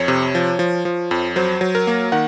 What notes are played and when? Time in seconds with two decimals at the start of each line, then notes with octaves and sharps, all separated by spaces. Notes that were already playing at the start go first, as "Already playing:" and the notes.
Already playing: F2 C#5
0.08 C3
0.35 F3
0.59 F3
0.85 F3
1.11 F2
1.36 F#3 C5
1.61 F#3
1.75 A#4
1.87 A#3
2.12 D#3 F#5